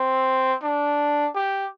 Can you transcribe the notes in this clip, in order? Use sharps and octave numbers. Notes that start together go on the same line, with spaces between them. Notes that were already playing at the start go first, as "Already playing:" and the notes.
Already playing: C4
D4
G4